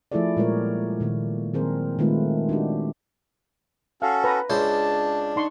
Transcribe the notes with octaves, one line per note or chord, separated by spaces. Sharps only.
F3 A3 E4 G#4 A4 D5
A#2 G3 G#3 B3 A#4 C#5
A#2 D#3 A#3
D#3 F#3 C4 G#4 A#4 C5
D#3 G#3 A3 C4 F4 B4
D4 D#4 F#4 G4
C#4 F#4 A4 F5
B4 A#5
C#2 C#3 D4 C5 A5
D#4 C6 C#6